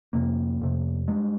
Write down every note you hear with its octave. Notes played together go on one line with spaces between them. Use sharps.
F2 C3 A#3
F2 C3
G2 G#3